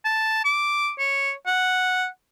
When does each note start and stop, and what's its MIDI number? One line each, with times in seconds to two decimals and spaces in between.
0.05 0.43 81
0.45 0.91 86
0.99 1.32 73
1.47 2.06 78